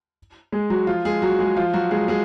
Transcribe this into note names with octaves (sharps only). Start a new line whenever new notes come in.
G#3 G#4
F#3 F#4
F3 F4
G#3 G#4
F#3 F#4
G#3 G#4
F3 F4
F#3 F#4
G#3 G#4
G#3 G#4